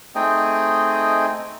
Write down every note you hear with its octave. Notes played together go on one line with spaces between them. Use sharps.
A3 C4 D#4 G#4 D#5 G5